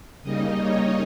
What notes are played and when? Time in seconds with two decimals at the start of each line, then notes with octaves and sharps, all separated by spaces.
0.23 C#3 G3 A#3 D#4 D#5
0.60 C#5